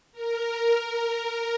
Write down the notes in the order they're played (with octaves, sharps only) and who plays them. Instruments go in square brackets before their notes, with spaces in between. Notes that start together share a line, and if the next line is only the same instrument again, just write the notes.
[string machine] A#4